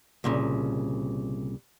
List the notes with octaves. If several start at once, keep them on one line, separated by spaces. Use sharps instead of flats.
C2 A#2 C#3